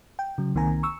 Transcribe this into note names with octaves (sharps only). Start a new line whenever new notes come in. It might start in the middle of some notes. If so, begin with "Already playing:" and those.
G5
C#3 F#3
C2 D#3 A#3 C4 G#5 A#5
C#6 E6